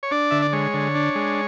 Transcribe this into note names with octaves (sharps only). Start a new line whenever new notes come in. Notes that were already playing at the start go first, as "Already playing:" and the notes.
C#5
D4 D5
D3 E5
D5
G#3 C#5
D3
D4
G#3